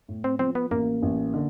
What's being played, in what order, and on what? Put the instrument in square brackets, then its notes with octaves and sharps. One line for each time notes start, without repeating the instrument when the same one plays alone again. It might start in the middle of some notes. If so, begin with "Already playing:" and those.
[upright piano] A2
[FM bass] C4
[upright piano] F3 [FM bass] C4
[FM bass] B3
[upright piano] A1 [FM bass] A#3
[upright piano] A1
D3